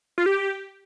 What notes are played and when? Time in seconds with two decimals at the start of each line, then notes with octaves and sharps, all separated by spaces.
0.18 F4
0.26 G4